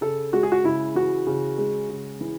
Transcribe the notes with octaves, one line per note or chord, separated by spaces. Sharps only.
C#3 A4
G#3 F#4
G#4
F#4
C#3 E4
E3 F#4
C#3
G#3
C#3
E3